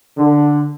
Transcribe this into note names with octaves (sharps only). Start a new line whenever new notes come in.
D3